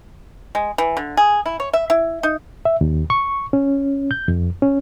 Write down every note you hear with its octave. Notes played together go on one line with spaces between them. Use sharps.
G#3
E3
D3
G#4
E4
C#5
E5
E4
D#4
E5
D#2
C#6
C#4
G6
F2
C#4